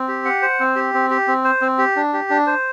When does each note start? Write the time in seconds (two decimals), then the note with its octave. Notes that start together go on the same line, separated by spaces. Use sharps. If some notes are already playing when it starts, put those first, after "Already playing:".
Already playing: C4
0.08 G4
0.25 F#5
0.42 C5
0.60 C4
0.76 G4
0.94 C4
1.10 G4
1.27 C4
1.44 C5
1.61 C4
1.78 G4
1.96 D4
2.13 G4
2.30 D4
2.47 C5